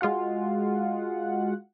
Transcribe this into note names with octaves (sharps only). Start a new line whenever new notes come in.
G#3 F4 F#4 F#5